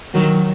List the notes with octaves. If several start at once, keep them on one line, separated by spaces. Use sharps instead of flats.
D#3 F#3